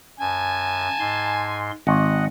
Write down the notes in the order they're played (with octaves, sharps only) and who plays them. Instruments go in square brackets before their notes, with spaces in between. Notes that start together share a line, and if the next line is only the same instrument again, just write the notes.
[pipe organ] F#2 [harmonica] G#5 A5
[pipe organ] G#2 C6
[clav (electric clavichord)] G#1 [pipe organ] D#5 F#5